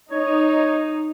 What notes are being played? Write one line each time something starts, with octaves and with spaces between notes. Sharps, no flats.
D#4 C#5